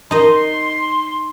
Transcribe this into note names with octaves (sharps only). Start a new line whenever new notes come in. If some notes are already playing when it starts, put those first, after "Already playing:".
D#4 D#5 C6